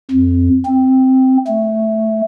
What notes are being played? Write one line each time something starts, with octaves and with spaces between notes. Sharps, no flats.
F2
C4
A3